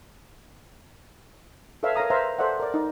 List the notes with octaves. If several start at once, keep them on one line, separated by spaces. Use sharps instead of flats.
A4 B4 C#5 E5 F5
A#4 C#5 F5 A#5 D#6
B4 C5 E5 F5 A#5
A4 C5 D5 E5 F#5
A#4 D5
D#4